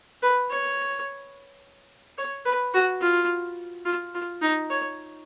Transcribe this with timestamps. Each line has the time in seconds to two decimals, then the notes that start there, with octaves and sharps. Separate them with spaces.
0.22 B4
0.50 C#5
2.18 C#5
2.45 B4
2.74 F#4
3.01 F4
3.85 F4
4.15 F4
4.42 D#4
4.70 C#5